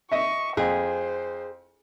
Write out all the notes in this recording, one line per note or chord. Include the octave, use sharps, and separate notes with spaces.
D#5 E5 C#6
F2 G#4 C5